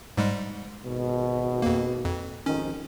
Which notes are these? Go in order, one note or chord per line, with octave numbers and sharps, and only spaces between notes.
G#2 G3 G#3
G#1 B2
F2 A#3
F2
G#1 F2 D#3 C#4